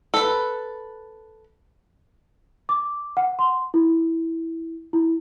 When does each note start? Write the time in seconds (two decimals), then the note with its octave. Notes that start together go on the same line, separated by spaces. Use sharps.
0.14 A4 B4
2.69 D6
3.17 F#5
3.39 C6
3.74 E4
4.93 E4